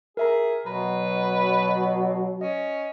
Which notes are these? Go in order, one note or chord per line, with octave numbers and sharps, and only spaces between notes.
G#4 A#4 E5 A#5
B2 F#3 B4 A#5
C#4 D#5